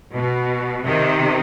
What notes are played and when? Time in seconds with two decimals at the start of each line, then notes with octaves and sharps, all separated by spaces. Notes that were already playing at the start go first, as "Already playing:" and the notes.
0.12 B2
0.82 C3 D#3